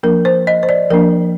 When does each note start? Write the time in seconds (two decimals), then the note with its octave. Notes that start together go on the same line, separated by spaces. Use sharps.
0.03 F3 A#3 D4 A#4
0.25 C5
0.47 D#5
0.63 C5
0.69 D5
0.90 F3 A#3 D4 A#4